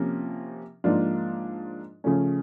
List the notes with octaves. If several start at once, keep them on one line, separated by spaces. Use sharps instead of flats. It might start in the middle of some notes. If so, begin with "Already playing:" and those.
Already playing: C3 F3 A#3 C#4
G#2 F3 A#3 D4 F4
C#3 F3 A3 C#4